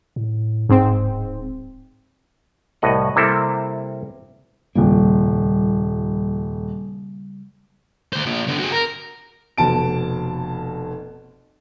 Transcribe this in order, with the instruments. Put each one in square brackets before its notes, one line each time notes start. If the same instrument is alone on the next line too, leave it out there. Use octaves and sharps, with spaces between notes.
[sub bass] A2
[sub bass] D1 [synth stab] G#2 C4
[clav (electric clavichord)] C2 A2 D#5 F#5
C3 G3 A#3 C4 E4 A4
[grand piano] D#1 F2 [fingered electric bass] C#3 G3 A#3
[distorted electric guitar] D2 C5
F3 A#3
D3 B3
F#4 G#4
A#4
[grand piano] F1 B2 A5 D7